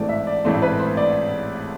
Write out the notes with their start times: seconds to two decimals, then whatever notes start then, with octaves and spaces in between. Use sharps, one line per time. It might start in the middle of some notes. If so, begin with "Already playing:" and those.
Already playing: A1 G#2 E3 A3 C4 D5
0.09 E5
0.27 D5
0.45 A1 G#2 E3 A3 C4 C5
0.62 B4
0.79 C5
0.97 D5